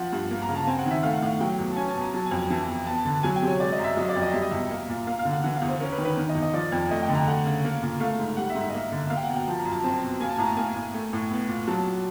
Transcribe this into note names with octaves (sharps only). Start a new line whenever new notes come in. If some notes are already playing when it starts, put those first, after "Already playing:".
Already playing: F3 F#5
G2
A#3
A#5
C#3
A5
C4 G#5
F#5
D#3 E5
A3 F5
F#5
A2 F5
F#3 G5
E2
A5
C#4 G#5
A5
B2
A#5
F#3 A5
G#5
F2
G#5
E3 A5
E2
B3 A5
D3 A5
F#3 G#5
G5
C3
C#5
G#3 D5
D#5
F#2
E5
F#3 D#5
D5
F2
D#5
G3 E5
D#5
E2 E5
A#3
A#2
A#3 F5
F5
D3
F#5
E3 F#5
F5
E2
C5
C#4 A#4
B4
D#3
B4
D#3
D#5
E2
D#5
F3 D5
F2
A3 D#5
G5
D3
A#5
A3 F#5
C#3
A#3
A#2
A3 F5
G#2
G3 F#5
E5
G#2
E5
D#5
A#3 E5
D3
E5
A#3 F5
G5
F#5
B2
G5
F3 A5
A#5
F#2
A5
C4 A5
B2
A#3 G#5
A5
A2 A#5
A5
A#3 G#5
A2
A3
A2
B3
A#2
F#3 A5